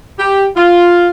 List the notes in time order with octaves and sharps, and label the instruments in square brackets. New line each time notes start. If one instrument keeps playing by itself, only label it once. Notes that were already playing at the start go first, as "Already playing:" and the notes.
[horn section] G4
F4